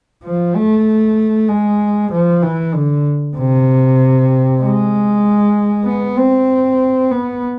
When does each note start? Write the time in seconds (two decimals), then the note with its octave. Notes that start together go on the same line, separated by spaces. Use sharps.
0.24 F3
0.55 A3
1.49 G#3
2.11 F3
2.42 E3
2.74 D3
3.36 C3
4.62 G#3
5.85 B3
6.17 C4
7.11 B3